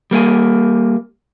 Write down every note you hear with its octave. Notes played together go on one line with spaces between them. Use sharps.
G3 A#3 A#4 G#5